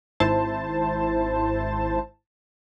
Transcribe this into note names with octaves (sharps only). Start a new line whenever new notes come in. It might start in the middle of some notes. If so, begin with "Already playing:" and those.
G#1 E4 C5 A5